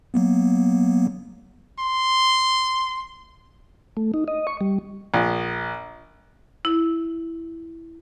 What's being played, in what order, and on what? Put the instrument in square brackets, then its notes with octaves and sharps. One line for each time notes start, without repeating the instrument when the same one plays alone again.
[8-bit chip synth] F#3 A#3 B3
[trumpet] C6
[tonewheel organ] A3
D#4
D#5
C#6
G3
[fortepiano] A#1
[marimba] E4